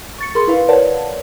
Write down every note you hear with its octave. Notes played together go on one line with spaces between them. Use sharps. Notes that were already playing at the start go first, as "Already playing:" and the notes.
C#6 A6 C#7
G#4 A#4 B5 C6
E4 B4 F5
A#4 B4 C#5 D5 F#5 A5